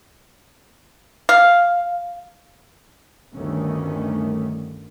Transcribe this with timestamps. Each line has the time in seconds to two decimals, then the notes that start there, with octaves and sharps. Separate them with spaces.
1.29 F5
3.34 G1 D2 D#3 G3 A3 C#4